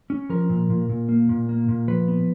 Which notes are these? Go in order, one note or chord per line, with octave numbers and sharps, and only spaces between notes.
C#4
F3 A#4
A#2
A#2
A#2
A#3
A#2
A#3
A#2
F3 B4
B3